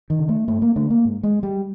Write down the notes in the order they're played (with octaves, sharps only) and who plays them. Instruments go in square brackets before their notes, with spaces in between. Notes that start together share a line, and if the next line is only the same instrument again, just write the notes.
[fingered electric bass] D#3
C#3
A3
G2 A3
A#3
D3 A3
A#3
G#2
G#3
G3